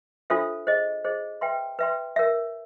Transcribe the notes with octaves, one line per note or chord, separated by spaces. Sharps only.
D4 F4 A4 C5 E5
G#4 C5 D#5
G#4 C5 D#5
B4 E5 G5 C6
B4 E5 G5 C6
A#4 C#5 E5